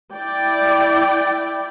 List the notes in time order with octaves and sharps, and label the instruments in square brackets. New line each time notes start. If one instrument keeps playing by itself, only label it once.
[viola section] E4 D5 G5